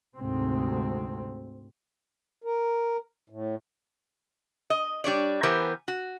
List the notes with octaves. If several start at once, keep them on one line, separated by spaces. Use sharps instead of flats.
D2 G#2 C3 C4
A#4
A2
D#5
G3 D4 C#5 D5
E3 B3 G4 A#4 C5 G#5
F#4